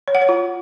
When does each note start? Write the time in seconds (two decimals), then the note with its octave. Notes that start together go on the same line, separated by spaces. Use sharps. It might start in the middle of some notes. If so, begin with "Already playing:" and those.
0.08 C#5
0.15 F#5
0.22 C#5
0.29 F4